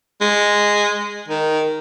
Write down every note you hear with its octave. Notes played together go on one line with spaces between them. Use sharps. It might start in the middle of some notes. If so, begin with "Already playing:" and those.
G#3
D#3